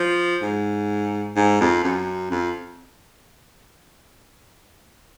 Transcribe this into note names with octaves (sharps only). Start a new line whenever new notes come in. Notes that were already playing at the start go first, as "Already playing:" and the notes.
Already playing: F3
G#2
G#2
F2
F#2
F2